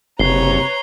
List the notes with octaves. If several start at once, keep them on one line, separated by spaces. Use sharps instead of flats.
F#1 C3 B4 C#5 A#5 C7 G7